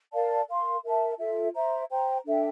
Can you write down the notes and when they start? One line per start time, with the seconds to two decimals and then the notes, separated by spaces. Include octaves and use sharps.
0.12 A#4 D5 F5 A5
0.48 A#4 F5 C6
0.84 A#4 E5 A5
1.18 F4 A4 E5
1.54 C5 E5 A#5
1.89 C5 G5 A#5
2.25 D4 A4 E5 G5